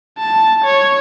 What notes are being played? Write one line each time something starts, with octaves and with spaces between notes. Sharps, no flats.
A5
C#5